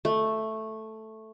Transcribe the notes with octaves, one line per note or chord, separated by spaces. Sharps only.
A3